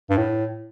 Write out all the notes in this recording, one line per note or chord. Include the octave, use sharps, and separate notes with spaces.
G2
A2